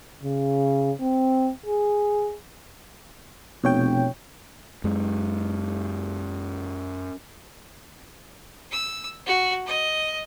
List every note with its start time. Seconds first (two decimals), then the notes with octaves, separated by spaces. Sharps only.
0.23 C#3
1.01 C4
1.66 G#4
3.64 F1 B2 C#5 G5
4.84 F#2 G#3
8.71 E6
9.26 F#4
9.66 D#5